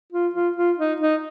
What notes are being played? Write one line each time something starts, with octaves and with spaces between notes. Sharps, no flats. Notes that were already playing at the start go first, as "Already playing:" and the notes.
F4
F4
F4
D#4
D#4